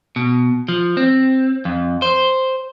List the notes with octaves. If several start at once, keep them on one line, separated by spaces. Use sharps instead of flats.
B2
F3
C4
F2
C5